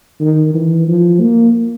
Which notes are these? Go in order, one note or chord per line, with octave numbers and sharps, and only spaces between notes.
D#3
E3
F3
A#3